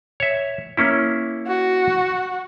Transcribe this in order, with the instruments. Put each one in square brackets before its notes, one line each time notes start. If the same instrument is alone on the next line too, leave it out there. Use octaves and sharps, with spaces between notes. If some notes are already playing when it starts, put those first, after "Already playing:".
[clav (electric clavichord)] C#5 E5
A#3 C#4 E4
[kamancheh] F#4